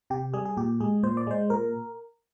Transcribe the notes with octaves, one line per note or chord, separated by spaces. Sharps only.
C3 G4
G3 G#4
G#4
A#2 G4
G#3 G#4
A#2 C5
D5
G#3 C5
A#2 A#4